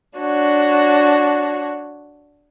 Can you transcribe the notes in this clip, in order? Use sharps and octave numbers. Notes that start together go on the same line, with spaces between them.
D4 F#4 C#5